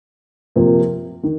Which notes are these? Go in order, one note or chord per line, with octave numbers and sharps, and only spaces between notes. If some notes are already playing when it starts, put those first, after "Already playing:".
C3 F3 A#3
D#3